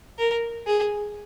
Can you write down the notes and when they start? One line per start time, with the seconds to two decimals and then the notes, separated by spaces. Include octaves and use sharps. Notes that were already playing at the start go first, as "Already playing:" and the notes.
0.18 A#4
0.67 G#4